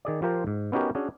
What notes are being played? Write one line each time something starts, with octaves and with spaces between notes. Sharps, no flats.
D#3 G#4 D5
F3 F4 G4 A#4 C5 F5
G#2
B3 C#4 D#4 F#4 G4 A#4
C#4 D4 F#4 G#4